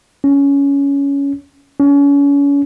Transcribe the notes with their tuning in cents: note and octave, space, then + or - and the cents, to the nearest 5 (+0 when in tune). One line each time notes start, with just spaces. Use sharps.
C#4 +15
C#4 +35